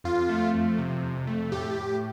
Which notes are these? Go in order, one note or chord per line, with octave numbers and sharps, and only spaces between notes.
F2 F4
A3
F3
C3
F2
A3
A2 G4
A2